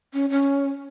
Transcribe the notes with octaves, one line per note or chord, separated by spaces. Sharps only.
C#4
C#4